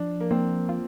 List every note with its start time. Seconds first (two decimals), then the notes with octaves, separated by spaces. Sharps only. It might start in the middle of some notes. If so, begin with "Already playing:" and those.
Already playing: F3 D4
0.20 A#3
0.31 A#3 C4
0.69 F4